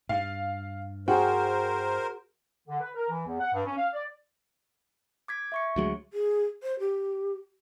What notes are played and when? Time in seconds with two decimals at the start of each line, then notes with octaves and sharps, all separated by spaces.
0.09 G2 F5
1.08 F#4 G#4 A#4 C5 G5
2.68 D3
2.81 B4
2.95 A#4
3.10 E3
3.26 E2
3.40 F#5
3.53 G2
3.65 C#4
3.77 F5
3.93 D5
5.28 D6 G#6 B6
5.52 E5 C#6 C#7
5.76 D2 F#3 G#3
6.13 G#4
6.63 C5
6.79 G4